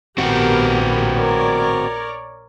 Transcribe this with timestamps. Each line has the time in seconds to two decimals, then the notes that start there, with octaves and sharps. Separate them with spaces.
0.18 A#1 B3 C4 F#4 G4 A#4
1.16 A#4 C#5 D5